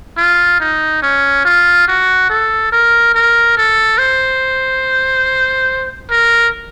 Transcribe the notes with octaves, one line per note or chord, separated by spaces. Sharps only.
F4
D#4
C#4
F4
F#4
A4
A#4
A#4
A4
C5
A#4